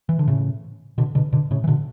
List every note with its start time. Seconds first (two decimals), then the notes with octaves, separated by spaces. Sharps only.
0.09 E3
0.19 D3
0.27 A2 C#3
0.98 B2 D3
1.15 B2 D3
1.33 B2 D3
1.51 A2 C#3
1.64 E3
1.68 B2 D3